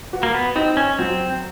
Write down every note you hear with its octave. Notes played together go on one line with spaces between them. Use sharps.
F#4
A#3
B3
C4 D#4
C#4
F#3 C4